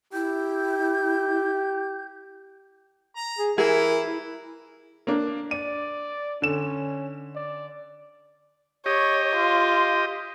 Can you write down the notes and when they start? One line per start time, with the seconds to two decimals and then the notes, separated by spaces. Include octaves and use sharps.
0.13 E4 G4 G6
3.16 A#5
3.39 G#4
3.58 E3 E4 G#4 A#4
4.06 E4
5.07 A#3 D4
5.51 D5 D#7
6.42 D3 C#4 E7
7.35 D5
8.86 G4 C#5 D#5
9.36 F4